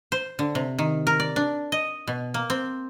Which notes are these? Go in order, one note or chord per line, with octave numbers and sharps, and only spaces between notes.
C5
D3
C3
D#3
A#4
D5
D4
D#5
B2
A#3
C4